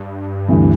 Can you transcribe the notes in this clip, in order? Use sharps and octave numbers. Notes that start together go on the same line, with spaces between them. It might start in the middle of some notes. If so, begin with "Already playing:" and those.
Already playing: G2
D2 C3 E3 G3